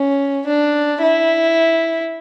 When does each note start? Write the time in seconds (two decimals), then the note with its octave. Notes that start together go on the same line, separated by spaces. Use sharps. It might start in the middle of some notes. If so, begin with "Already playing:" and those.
Already playing: C#4
0.47 D4
1.02 E4